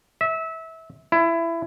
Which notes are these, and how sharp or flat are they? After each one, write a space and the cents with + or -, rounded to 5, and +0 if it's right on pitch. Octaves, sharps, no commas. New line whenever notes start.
E5 -25
E4 +20